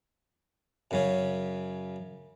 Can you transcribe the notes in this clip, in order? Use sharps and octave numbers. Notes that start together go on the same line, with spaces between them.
F#2 C#3 C#4